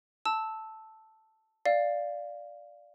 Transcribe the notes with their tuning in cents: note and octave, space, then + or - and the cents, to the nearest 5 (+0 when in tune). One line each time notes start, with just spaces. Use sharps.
A5 +0 E6 -10
D5 +0 F5 +0